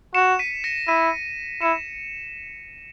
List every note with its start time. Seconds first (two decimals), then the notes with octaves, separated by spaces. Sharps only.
0.14 F#4 C#7 E7
0.39 B6 D#7
0.64 A#6 C#7
0.88 E4 B6 D#7
1.61 E4 C#7 E7